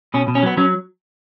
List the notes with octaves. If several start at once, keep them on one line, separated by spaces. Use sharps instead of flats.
B2 C#4
B2
C#4
F#3 B3
F#3 C#4